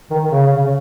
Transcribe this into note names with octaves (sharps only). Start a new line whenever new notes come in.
D#3
D#3
C#3
C#3
C#3
C#3